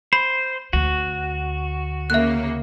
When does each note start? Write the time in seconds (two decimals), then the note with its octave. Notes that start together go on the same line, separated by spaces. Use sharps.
0.13 C5 B5
0.73 D2 F#4
2.10 C#3 A#3 E5 F#6